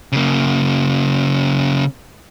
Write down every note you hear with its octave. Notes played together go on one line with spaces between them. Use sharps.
C#3 A#3